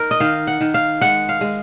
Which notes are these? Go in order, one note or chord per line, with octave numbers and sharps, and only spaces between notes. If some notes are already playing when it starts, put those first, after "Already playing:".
Already playing: D#4 A#4
D#5
D#3 F5
F#5
D#3
F5
G#3 F#5
F5
G#3